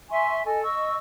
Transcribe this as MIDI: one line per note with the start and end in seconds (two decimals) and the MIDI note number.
0.09 0.43 76
0.09 0.43 80
0.09 0.43 84
0.09 0.43 85
0.45 0.62 69
0.45 0.62 75
0.45 0.62 80
0.62 0.96 75
0.62 0.96 85
0.62 0.96 88